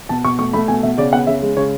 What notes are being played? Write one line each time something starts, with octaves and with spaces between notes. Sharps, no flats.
B2 A5
B2 C#6
A3 C#6
A3 B5
B2 G#5
B2 E5
C#3 D5
B3 F#5
C#3 E5
G#3
C#3 C#5